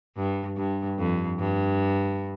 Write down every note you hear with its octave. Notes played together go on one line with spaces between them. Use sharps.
G2
G2
F2
G2